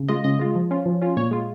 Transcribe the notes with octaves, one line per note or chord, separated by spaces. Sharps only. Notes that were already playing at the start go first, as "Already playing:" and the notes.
Already playing: C#3
G#3 F4 D#5
C#3 D#5
G#3 F4
F3
C#4 F4
F3
C#4 F4
A#2 C#5
G#3 F4